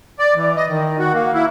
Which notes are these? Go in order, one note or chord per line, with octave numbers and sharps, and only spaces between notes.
D5
E3
D#5
D#3
F#4
A#3
E4